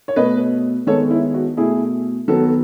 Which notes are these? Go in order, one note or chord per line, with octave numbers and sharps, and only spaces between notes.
C#5
B2 A3 B4 D#5
D#3 G#3 B3 A4 C#5
E4
F#4
B2 A3 E4 G#4
D#3 F#3 B3 F#4 A4